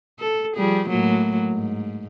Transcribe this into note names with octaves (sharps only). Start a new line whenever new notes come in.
A4
F3 G3 G#4
A2 F#3 A#3
G#2